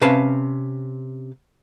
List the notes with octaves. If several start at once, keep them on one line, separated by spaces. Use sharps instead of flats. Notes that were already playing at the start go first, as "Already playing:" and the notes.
C3 C#4 B4 F5 A5